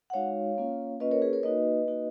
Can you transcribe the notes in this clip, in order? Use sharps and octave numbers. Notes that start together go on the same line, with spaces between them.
F#5
G#3 D#4 F#4 C#5 F5
A#3 C#4 F4
A#3 C#4 F4 B4 D#5
A#4 C#5
G#4 B4
A#4 C#5
A#3 D#4 F#4 B4 D#5
A#3 D#4 F#4